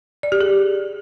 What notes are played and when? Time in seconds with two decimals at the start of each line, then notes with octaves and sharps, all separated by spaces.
0.23 D5
0.32 G4
0.41 G#4